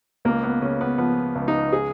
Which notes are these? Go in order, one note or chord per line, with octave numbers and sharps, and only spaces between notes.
C#2 A#3
B3
C#3 C#4
B3
F3 B3
C#2
D#4
G#4